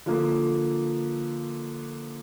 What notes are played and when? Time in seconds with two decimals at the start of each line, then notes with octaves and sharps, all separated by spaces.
0.06 D3 F3 A#3